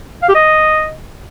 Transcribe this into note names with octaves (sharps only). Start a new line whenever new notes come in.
F5
G4
D#5